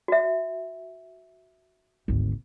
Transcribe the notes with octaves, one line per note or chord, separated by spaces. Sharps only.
F#4 E5
G#1 D2